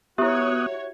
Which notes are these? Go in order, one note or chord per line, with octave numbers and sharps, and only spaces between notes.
B3 E4 F#4 G4 C#5 E5 D#6 F#6